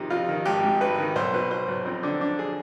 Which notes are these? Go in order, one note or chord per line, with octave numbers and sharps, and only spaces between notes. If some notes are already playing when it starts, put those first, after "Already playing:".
Already playing: F2 C3 D#3 D#4
F2 F4
D#3
G#1 G4
G#2
G#1 B4
D#3
B1 C5
B2 B4
B2 C5
B1 B4
F2 C4
D3 D4
D3 D4
G#4